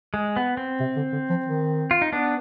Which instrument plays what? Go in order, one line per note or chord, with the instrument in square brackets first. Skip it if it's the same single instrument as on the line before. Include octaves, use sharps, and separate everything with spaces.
[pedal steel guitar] G#3
B3
C4
[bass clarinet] C3
D3
D3
F3
D#3
[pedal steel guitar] F4
D#4
B3 D4